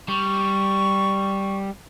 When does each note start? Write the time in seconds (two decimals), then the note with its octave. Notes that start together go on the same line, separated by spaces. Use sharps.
0.09 G3 C#6